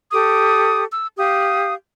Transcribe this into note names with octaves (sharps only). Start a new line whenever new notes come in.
G4 A4 D6 D#6
E6
G4 F5 D#6